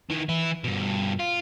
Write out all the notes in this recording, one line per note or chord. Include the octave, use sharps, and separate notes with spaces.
D#3 E3
E3 E4
G2 B2
F4